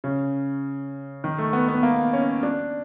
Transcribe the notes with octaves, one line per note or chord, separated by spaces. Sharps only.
C#3
D#3
A3
B3
B3
A#3
C#4
D4